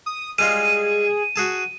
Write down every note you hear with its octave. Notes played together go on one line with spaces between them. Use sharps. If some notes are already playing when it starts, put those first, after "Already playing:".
D#6
G3 G#3 F4 G#4 D#7
F#4 G#4 A5